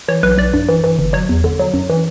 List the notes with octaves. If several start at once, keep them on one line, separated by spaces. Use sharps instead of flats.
E3 C#5
B1 B4
B1 D5
G2
E3
E3
G1
F#3 C#5
E2
D3
F#3
F#2
E3